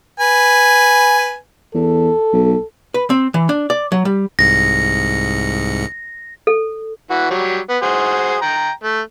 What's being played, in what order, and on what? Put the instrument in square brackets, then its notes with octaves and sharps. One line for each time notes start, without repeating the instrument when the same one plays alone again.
[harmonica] B4 G#5
[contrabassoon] E2 [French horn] A4
[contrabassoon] B1
[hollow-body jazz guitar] B4
C4
E3
D4
D5
F#3
G3
[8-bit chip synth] C2 G#2 C#7 [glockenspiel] A#6
[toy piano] A4
[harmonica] E3 F#4
F#3 G3
B3
F#4 G#4 C5
G5 A#5
A3